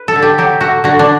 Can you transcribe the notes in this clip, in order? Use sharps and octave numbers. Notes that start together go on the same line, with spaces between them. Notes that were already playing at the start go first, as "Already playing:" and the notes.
Already playing: B4
A4
D3
G4
F#3 G4
A3 F#4
D3 F#4
D4